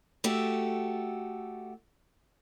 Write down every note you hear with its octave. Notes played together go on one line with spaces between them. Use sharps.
A3 F#4 G4 A4